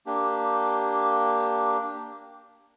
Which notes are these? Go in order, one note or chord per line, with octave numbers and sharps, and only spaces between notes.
A#3 D4 G4